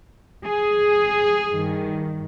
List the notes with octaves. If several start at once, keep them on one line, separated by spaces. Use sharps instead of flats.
G#4
G2 D#3